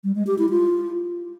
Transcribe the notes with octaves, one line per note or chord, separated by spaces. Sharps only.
G3
G#3
G4
E4
F4